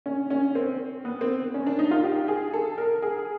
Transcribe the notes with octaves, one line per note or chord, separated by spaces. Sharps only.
C#4
C#4
C4
B3
C4
C#4
D4
D#4
F4
G4
G#4
A4
A#4
G#4